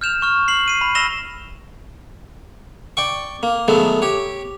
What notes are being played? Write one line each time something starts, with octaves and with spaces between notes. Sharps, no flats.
F6 G6 E7 F7
C#6 F6
C7 F#7
C7 D#7
B5
E6 A#6 E7 F7 G7
D5 G5 C#6
A#3
D#3 F#3 G#3 A3 B3
G4 C#5